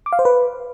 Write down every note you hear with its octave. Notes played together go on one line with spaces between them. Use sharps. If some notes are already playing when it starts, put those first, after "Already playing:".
D6
F5
C5
B4